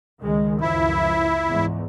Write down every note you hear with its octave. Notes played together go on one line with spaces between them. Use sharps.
C#2 D#3 G#3
C#2 F#2 F3 E4
E2 G#2